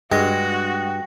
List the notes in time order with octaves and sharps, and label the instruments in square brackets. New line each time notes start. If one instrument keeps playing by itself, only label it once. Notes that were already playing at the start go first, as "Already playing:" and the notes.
[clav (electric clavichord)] G2 [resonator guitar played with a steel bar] G#3 [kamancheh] F#4 [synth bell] G5 A#6